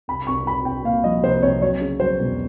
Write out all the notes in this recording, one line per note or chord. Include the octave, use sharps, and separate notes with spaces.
C2 B5
C2 C#6
C2 B5
C2 G5
A#2 F5
F3 D#5
C2 C5
C2 C#5
F#3 C#5
C#3
F#3 C5
E1